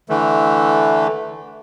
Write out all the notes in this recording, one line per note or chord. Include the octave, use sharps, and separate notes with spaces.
D3 E3 A3